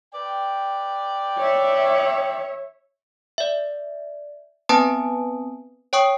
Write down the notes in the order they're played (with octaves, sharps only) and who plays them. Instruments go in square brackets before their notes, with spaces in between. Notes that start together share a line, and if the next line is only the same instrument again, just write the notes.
[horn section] B4 D5 G5
[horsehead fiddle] C#5 E5
[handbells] D5 E5
B3 C4 B4 G#5 A5 D#6
C#5 G5 C#6 D#6